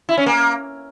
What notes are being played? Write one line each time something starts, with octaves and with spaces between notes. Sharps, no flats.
E4
C#4
A#3